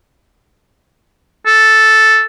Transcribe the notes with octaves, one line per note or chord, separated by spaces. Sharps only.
A4